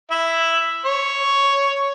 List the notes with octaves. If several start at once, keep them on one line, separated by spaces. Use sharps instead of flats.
E4 E5
C#5